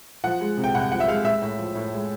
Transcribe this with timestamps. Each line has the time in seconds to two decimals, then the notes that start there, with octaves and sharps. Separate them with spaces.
0.24 F3 F#5
0.41 G#3
0.57 C3
0.64 G5
0.75 C2 F#5
0.91 F3 F#5
1.00 E5
1.08 G#3 F5
1.25 G#3 E5
1.42 A2
1.59 F3
1.75 A2
1.93 G#3